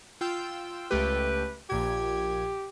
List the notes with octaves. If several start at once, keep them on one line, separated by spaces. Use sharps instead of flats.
F4 G5 E6
C#2 A3 G4 B4
A#1 A#2 G4 G#6